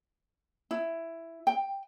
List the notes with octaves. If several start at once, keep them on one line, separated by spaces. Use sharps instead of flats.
E4
G5